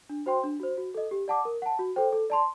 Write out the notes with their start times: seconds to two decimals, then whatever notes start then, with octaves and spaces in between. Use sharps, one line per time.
0.09 D4
0.26 F#4 C5 G5 C6
0.44 D4
0.60 F#4 C5
0.78 F#4
0.94 A4 D#5
1.11 G4
1.28 D5 F#5 A5 D6
1.45 A#4
1.62 F#5 A5
1.79 F#4
1.96 A4 C5 G5
2.12 A4
2.30 D5 A5 C6